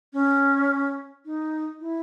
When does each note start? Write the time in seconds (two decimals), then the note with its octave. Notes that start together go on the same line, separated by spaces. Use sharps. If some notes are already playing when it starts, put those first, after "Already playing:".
0.13 C#4
1.25 D#4
1.80 E4